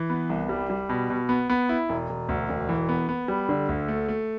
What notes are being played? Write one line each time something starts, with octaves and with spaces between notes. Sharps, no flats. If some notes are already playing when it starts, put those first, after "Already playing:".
Already playing: E3
B3
C2
G3
G3
B2
B2
B3
B3
E4
E1
E1
D2
E1
E3
B3
B3
G3
D3
D2
A3
A3